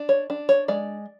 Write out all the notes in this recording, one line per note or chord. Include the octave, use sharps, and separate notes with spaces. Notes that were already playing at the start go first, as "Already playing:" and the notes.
Already playing: D4
C#5
D4
C#5
G#3 D5